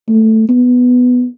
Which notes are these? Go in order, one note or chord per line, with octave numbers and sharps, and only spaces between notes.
A3
B3